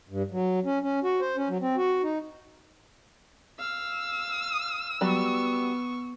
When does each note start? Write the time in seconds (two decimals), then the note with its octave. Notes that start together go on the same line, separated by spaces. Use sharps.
0.09 G2
0.31 F#3
0.65 C#4
0.82 C#4
1.04 F#4
1.21 C5
1.36 C#4
1.49 F#3
1.61 C4
1.77 F#4
2.03 D#4
3.59 F5 E6
5.01 F#3 G3 B3 C#6